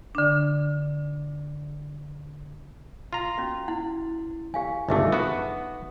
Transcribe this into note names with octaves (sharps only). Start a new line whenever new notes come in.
D3 D4
F4 A#5
C#4 F#4
E4 F#5
G4 F5 G#5
G1 C#2 A3 D#4 E5 D6
B3 F#4